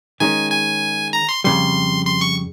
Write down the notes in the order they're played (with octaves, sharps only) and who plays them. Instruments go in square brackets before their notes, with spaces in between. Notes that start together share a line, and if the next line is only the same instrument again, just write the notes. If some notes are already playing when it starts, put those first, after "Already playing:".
[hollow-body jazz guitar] D#3 G#3 C#4 [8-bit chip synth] G#5
[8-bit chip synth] G#5
A#5
C6
[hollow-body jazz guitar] F2 C#3 G3 [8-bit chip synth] C6
[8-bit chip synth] C6
C#6